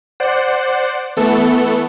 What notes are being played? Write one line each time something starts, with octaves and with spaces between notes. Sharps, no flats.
C5 D5 F#5
E3 A3 B3 A4